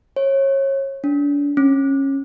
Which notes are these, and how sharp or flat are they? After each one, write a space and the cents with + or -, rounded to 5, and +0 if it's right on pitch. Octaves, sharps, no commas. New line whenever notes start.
C#5 -30
D4 -35
C#4 -20